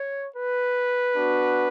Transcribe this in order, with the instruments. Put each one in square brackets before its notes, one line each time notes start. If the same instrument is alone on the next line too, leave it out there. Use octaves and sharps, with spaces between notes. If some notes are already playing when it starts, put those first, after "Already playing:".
Already playing: [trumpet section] C#5
B4
B3 D4 F#4